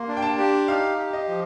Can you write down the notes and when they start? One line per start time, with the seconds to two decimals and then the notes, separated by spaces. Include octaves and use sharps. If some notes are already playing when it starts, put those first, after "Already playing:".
Already playing: A#3 C6
0.08 D4
0.17 G5
0.22 A5
0.38 G4
0.68 D#4 F5
0.98 G4
1.13 D#5
1.28 F3